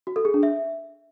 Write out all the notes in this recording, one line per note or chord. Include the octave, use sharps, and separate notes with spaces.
F#4
A4
G#4
D4
E5